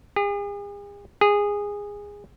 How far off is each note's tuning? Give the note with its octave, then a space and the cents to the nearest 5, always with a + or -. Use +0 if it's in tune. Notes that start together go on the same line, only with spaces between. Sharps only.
G#4 -45
G#4 -20